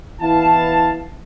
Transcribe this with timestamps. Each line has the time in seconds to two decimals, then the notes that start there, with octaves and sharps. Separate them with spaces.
0.21 E3 B3 E4 F5 A5